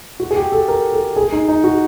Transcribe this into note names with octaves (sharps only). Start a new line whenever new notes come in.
F#4
G#4
G4
A4
A#4
A4
G#4
D#4
D#4
F#4